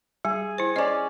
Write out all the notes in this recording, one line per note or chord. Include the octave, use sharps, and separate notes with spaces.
G3 G#4
E4 C5
C#4 D5 D#5 G#5